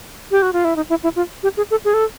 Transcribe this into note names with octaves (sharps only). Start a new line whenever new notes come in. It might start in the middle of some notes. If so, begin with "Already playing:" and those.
G4
F#4
F4
E4
D#4
E4
E4
F4
G4
G#4
A4
G#4
A4